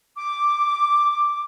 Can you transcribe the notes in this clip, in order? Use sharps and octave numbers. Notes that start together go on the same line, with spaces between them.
D6